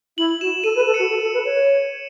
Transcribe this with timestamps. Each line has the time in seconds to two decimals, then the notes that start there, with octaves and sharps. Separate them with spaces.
0.17 E4 F#7
0.41 F#4 E7
0.64 A4 D#7
0.76 B4
0.80 D#7
0.86 A4
0.94 F#4 C#7
1.10 A4
1.22 A4
1.34 B4
1.45 C#5